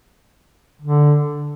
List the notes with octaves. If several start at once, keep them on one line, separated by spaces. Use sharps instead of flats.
D3